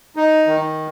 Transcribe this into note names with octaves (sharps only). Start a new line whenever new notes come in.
D#4
D#3